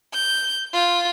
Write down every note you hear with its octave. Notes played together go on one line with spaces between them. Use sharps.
G6
F4